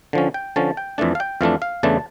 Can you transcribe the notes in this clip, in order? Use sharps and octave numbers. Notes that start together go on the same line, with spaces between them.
D3 F3 C#4
G5
D3 F3 C#4 A5
G5
F2 E3 A3 D4 A5
F5
G5
F2 E3 A3 D4 F5
F5
E2 C#3 E3 A3 D4 A5